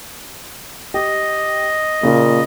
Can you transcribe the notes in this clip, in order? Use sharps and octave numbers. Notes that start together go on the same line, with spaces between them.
G4 D#5
A#2 C#3